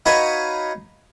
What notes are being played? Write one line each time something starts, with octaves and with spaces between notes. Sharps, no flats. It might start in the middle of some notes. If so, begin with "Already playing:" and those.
D#4 F#4 B4 C#5 D#5 F5